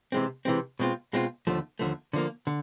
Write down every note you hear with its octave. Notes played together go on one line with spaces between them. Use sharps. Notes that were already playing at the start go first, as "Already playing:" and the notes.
C3 E3 G#3 C4
C3 E3 G#3 C4
B2 G#3 C4 F4
B2 G#3 C4 F4
D#2 D3 F3 A3
D#2 D3 F3 A3
D3 F3 A#3
D3